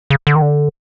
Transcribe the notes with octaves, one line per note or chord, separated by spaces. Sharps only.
C#3
D3
D#3
D3